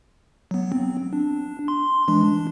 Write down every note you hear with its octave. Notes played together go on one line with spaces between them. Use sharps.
F#3 B3
C4
D4
C6
E3 G#3 D4
D4